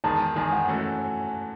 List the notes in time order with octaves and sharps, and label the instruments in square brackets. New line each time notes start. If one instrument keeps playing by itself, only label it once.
[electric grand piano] E2 D#3 G#3 D#4 G#4 [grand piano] A5
[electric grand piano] E2 D#3 G#3 D#4 G#4 [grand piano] G#5
[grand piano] F#5
[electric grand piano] E3 A3 C#4 F#4 A4